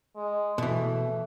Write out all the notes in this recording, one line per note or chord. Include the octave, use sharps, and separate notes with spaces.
G#3
B2 E3 A3